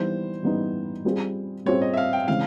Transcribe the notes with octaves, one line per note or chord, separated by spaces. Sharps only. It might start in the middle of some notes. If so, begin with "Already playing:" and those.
Already playing: E3 G3 B3 D#4 C5
E3 G3 B3 D#4
G3 C4 F4 G#4
G3 C4 F4 G#4 C#5
D#5
E5
F5
G5
C#3 E3 G#3 C4 F5